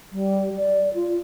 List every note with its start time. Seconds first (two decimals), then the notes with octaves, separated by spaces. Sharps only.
0.12 G3
0.56 D5
0.94 F4